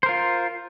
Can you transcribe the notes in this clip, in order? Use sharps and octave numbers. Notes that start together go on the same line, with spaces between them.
F4 A#4 C5